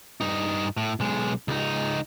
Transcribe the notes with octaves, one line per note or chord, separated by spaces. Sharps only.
G2 D#4
A2
B1 G#3
C#2 D#4